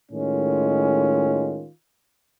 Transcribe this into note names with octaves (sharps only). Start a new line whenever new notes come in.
A2 D#3 G#3 C#4 F4